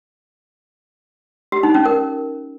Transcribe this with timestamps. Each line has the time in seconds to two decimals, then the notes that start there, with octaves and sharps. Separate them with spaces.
1.52 G4
1.63 D#4
1.74 C#4
1.85 A#4